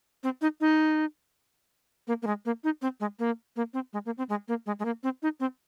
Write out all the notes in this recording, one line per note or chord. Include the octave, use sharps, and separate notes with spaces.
C4
D#4
D#4
A#3
A#3
G#3
A#3
D#4
C4
G#3
A#3
A#3
C4
G#3
A#3
C4
G#3
A#3
G#3
G#3
A#3
C4
D#4
C4